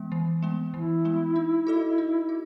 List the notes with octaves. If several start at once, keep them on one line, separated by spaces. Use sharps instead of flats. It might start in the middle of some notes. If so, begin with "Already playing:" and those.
Already playing: E3 G#3 B3
E3
G#3 B3
E3 E4
G#3 B3
D#4
F#4 A4 D#5
D#4
F#4